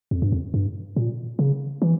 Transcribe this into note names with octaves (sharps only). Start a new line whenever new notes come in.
F2
G2
F2
G2
A#2
C#3
E3